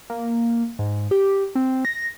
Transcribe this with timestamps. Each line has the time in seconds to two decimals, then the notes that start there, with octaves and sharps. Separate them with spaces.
0.10 A#3
0.79 G#2
1.11 G4
1.55 C4
1.85 A#6